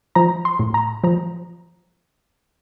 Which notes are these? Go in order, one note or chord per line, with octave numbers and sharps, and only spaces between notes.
F3 A#5
C6
A2
A#5
F3 A#5